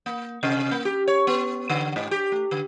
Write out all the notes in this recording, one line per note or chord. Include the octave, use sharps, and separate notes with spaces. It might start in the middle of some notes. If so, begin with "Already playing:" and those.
A#3
C3
A#3
G4
C#5
B3
D3
G#2
G4
A3
D3